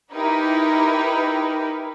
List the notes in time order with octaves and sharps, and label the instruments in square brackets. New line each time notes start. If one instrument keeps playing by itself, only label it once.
[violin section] D#4 E4 G4 A#4 B4